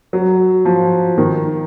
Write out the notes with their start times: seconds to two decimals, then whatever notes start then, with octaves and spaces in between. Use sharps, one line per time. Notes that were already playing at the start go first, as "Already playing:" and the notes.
0.13 F#3
0.65 F3
1.18 D#3